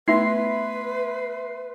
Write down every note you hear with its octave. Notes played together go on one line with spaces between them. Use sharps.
A3 B3 E4 B4 E5 C6 C7